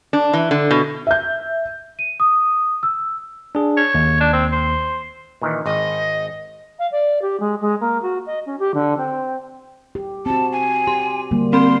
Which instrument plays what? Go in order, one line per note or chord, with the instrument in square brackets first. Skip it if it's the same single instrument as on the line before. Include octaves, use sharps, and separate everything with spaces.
[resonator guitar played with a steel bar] D4
E3
D3
B2
[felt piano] E5 G6
[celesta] D#7
D#6
E6
[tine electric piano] D4 G#4
[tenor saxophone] C#5
[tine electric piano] D#2
[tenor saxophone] D4
C4
C5
[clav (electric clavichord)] A#2 D#3 E3
[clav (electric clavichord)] G#1 [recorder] D#5
[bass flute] F5
D5
G4
G#3
G#3
A#3
F#4
D#5
C#4
G4
D3
C4
[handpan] G4
[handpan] C4 F#4 [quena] A5
[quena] G#5
[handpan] G4 [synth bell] C6
[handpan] D3 G3 A#3
[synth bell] C4 B5 [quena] C6